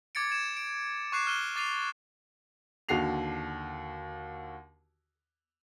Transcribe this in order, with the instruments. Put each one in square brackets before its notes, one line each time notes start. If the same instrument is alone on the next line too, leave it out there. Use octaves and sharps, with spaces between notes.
[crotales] D6 G#6 A6 C#7 D7
G#6 E7
D7
C#6 D6 F#6 C7 E7
F6 F#6 D#7 G7
D6 A6 C7 D#7 F7
[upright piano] D#2 D3 F#4 C7 F7